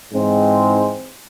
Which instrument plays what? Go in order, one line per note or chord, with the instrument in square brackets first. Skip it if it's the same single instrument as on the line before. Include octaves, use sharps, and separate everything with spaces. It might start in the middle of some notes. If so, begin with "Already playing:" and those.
[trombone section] G#2 E3 G#3 C4 D#4